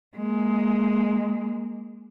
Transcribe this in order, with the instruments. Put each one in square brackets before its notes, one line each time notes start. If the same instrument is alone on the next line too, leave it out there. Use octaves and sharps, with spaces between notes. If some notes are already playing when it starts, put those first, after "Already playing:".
[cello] G#3 A#3